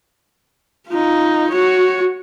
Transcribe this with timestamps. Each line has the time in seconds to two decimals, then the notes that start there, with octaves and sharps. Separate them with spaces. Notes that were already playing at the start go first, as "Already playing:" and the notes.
0.88 D#4 F4
1.51 F#4 C#5